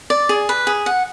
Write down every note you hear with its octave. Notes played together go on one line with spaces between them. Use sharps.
D5
G#4
B4
G#4
F#5